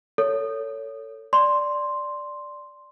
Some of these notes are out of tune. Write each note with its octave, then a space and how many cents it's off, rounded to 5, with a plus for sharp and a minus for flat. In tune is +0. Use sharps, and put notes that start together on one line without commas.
A4 +25 C#5 +20
D5 +0 C6 +0